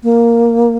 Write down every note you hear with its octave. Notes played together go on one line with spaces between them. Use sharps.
A#3